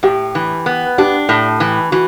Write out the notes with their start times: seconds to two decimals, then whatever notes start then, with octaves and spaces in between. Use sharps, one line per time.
0.03 A2 G4
0.35 E3
0.66 B3
0.98 D4 G4
1.29 A2
1.60 E3
1.92 E3 F#4